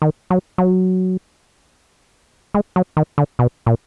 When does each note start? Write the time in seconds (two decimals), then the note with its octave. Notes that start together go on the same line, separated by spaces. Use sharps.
0.02 D#3
0.30 F#3
0.58 F#3
2.54 G#3
2.76 F#3
2.97 D#3
3.18 D3
3.39 B2
3.66 A#2